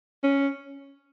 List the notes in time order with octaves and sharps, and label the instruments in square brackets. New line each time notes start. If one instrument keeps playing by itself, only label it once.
[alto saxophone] C#4